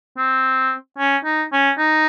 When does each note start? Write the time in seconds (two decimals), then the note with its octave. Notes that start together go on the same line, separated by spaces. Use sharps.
0.17 C4
0.98 C#4
1.25 D#4
1.53 C#4
1.78 D#4